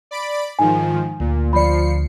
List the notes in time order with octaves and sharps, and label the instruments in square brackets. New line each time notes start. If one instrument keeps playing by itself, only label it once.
[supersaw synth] D5 B5 D7
[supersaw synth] G#2 D#3 F3 [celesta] G#5
[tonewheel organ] D2 [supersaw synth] A#2
[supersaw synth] F3 C7 C#7 [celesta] D5 B5